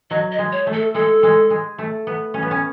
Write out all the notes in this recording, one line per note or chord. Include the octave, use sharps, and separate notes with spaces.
F#3 D#5
D#5
G#3
C#5
A3
A4
G#3 A4
G#3
G#3
A3
B3
C#4
B3
C#4